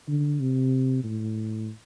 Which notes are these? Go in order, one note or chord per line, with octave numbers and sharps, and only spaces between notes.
D3
C3
A2